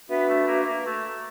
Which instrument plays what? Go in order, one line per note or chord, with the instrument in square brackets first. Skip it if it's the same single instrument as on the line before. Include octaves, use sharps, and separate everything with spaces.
[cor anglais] B3 [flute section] D4 F#4 B4 E5
[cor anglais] A3
A#3
A#3
A3